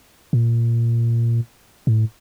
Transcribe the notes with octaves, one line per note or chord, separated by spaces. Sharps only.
A#2
A2